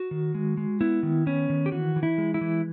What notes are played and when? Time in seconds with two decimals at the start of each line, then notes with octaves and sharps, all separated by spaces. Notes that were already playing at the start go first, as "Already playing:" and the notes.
Already playing: F#4
0.11 D#3
0.35 G#3
0.57 G#3
0.81 B3 E4
1.03 D#3
1.26 B3 C#4
1.50 D#3
1.66 G4
1.72 E3 F#4
1.96 E3
2.03 E4
2.18 G#3
2.34 E4
2.41 E3